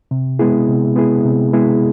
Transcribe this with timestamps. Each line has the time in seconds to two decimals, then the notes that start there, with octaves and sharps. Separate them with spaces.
0.11 C3
0.39 G#3 B3 E4 G#4
0.68 C3
0.96 G#3 B3 E4 G#4
1.25 C3
1.53 G#3 B3 E4 G#4